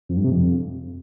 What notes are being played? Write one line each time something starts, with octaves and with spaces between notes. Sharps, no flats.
F2
G2
C3
F2